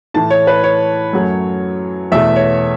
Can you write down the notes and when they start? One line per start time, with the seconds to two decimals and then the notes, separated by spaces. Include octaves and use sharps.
0.14 A2 E3 A3 A5
0.31 C#5
0.47 B4
0.64 C#5
1.13 F#2 F#3 A3
2.12 E2 B2 A3 E5
2.36 C#5